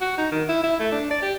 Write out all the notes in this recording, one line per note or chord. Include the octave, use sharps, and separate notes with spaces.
F#4
D#4
D#3
E4
E4
A3
D4
D5
G4